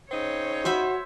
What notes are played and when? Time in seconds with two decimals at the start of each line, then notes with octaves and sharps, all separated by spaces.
0.11 C#3 C4 D#4 C#5
0.65 F#4 C5 E5 B5